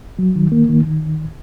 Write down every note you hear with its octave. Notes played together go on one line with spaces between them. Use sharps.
F#3
D#3
A#3
D#3
D#3